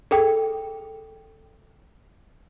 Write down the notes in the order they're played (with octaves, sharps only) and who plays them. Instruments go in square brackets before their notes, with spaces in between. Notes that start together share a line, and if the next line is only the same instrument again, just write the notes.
[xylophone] G#4 A4 G5